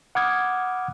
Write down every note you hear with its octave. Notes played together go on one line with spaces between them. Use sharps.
F#5 B5 D6 D#6 F6 G#6